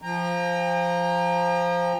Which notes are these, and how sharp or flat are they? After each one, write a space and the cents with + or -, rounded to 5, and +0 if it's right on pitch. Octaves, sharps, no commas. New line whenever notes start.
F3 +0 G5 +40 A#5 +0